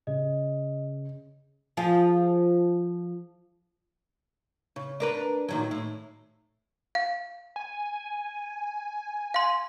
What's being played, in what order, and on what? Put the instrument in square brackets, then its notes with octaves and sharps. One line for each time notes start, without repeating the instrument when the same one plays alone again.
[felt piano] C#3 [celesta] D#5
[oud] F3 F4 G#4
C#3
D4 A#4 B4
A#2 D#3 F#3
A2
[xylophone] F5
[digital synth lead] G#5
[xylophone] F5 C6